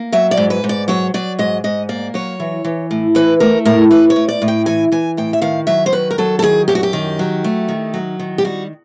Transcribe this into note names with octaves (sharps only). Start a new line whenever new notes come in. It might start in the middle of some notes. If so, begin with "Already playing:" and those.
Already playing: A#3
F#3 E5
D5
G#2
B4
G#2
D5
F#3 C#5
F#3 D5
G#2 D#5
G#2 D#5
A#3 D5
F#3 C#5
E3
E3
A2
E3 B4
A3 A#4
A2 A#4
A2 B4
C#5
A2
D5
A2
G5
E3 G#5
E3 G#5
A2 G5
E5
D#3 F5
F#3 E5
C5
D#3 B4
A#4
F#3 A4
A4
D#3 G#4
F#2 G4
F#4
G4
D#3
F#3
A3
D#3
F#3
D#3
G4
G3 F#4